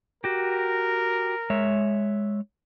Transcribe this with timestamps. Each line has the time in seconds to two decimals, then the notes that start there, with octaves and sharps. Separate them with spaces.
0.24 F#4 G4 A#4
1.50 G#3 C#5 E5